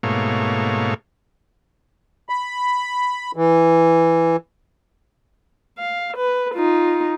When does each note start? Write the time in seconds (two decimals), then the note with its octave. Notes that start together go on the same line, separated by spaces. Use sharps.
0.03 G#2 B2 A3 A#3 C#5 F5
2.29 B5
3.36 E3
5.78 F5
6.17 B4
6.54 D#4 F4